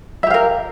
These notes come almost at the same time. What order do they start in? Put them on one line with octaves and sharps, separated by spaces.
E5 G4 F5 A#4